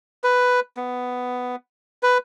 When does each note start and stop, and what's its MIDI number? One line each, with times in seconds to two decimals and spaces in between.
0.24 0.60 71
0.77 1.56 59
2.03 2.18 71